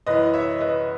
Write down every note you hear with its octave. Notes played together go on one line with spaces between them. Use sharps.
F#2 E3 B4 D#5
C#5 E5
B4 D#5